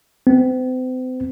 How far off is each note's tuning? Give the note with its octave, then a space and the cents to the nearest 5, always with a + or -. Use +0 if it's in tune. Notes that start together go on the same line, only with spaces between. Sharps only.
C4 -40